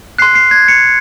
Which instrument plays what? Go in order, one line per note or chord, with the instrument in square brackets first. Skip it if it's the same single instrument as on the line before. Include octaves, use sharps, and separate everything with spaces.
[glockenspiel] C6 F#6 C7
C7
G#6
C#7